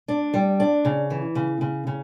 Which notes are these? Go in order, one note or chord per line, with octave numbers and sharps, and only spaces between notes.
D4
G3
D4
C#3
E3
C#3
C#3
C#3